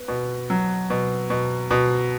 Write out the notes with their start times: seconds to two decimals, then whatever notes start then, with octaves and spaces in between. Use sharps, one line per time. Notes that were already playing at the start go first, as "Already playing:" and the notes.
Already playing: B3
0.08 B2
0.50 F#3
0.90 B2
1.30 B2
1.71 B2